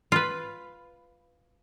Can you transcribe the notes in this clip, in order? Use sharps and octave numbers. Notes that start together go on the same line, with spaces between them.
F4 B4